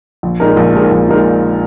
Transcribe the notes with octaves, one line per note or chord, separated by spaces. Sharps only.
A#1
A#2 G#3 D#4 A#4
A#1
A#2 G#3 D#4 A#4
A#1
A#2 G#3 D#4 A#4